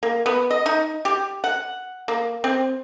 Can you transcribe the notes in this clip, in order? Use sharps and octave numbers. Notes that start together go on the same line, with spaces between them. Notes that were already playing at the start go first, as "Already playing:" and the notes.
A#3
B3
D#5
D#4
G4
F#5
A#3
C4